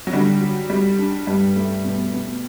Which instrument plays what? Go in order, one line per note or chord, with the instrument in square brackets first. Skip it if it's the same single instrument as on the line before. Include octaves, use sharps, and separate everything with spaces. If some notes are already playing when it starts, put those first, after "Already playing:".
[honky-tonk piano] F#3
[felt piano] D3 [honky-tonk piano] G3
[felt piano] F#3
[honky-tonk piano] G3 [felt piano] G4
[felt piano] D4
[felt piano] G2 [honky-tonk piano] G3
[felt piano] A3
B2
B2